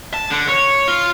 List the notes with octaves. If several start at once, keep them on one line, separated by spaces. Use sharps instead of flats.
A5
D3
C#5
F4